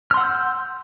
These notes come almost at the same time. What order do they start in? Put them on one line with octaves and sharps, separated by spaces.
F6 C6 F#5 E6 G6